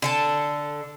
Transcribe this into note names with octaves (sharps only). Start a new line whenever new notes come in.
D3 A4 A5